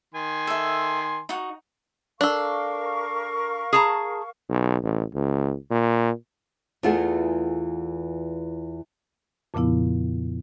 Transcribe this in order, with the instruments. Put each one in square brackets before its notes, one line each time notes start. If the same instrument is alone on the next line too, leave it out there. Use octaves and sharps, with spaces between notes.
[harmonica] D#3 G#5 C6
[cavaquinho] A4 E5
D#4 F#4
[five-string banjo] D4 A4 [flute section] A#4 F5 C#6
[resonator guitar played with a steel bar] G#4 A5 A#5
[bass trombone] B1
A1
C#2
A#2
[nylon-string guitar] E2 E3 A3 F4 G#4 F#5
[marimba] F2 A#2 C#3 F3 B3 E4